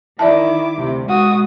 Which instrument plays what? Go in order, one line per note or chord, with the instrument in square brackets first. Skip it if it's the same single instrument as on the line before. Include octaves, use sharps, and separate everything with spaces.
[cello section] D#3 [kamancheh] E4 D6 [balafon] D5 E5 A5
[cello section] D2 C3
[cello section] B2 G#3 [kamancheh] F#4 D#6